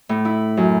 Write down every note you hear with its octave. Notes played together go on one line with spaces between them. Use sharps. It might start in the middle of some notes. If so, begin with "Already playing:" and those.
A2
E4
F#2